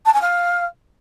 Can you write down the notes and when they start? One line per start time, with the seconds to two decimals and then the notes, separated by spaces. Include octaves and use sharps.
0.06 A5
0.13 G#5
0.21 F5